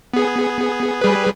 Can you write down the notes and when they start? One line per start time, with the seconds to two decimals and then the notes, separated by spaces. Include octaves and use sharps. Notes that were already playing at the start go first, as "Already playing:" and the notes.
0.14 B3 G#4
1.01 G3 G#4 B4